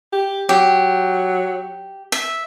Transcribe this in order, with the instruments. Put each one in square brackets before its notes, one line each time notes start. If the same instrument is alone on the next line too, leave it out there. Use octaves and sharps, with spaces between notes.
[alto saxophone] G4
[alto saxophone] F#3 [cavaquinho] G4
[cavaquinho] E5